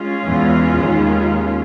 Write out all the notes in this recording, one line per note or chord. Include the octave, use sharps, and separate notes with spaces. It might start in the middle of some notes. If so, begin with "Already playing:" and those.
Already playing: G#3 C#4 F4
E2 E3
D#2 D#3